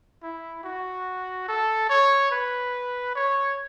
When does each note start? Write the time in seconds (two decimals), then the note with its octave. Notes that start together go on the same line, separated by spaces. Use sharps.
0.23 E4
0.64 F#4
1.48 A4
1.89 C#5
2.31 B4
3.15 C#5